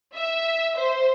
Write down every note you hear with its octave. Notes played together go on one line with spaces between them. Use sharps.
E5
C5